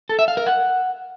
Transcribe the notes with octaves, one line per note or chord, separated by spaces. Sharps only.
A4
E5
F5
A#4
F#5